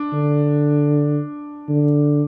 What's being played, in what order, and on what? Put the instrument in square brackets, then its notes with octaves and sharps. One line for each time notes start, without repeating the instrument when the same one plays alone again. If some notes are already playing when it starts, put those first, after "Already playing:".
Already playing: [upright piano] D4
[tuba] D3
D3